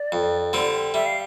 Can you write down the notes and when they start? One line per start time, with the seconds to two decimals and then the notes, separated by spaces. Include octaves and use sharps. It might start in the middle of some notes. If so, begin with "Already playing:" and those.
Already playing: D5
0.12 F2
0.53 D3 G3 C4
0.94 G3 E5
1.06 F5